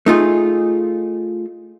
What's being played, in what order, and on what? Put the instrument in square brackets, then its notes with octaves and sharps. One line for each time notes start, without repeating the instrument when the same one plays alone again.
[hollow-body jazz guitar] A3 D#4 F4 G#4